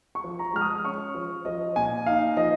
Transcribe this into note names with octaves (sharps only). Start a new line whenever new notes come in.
C#6
F3
A#5
G#3 F6
D#6
C#4 C#6
F3
F3 D#5
A#2 G#5
D#4 F5
F3 D#5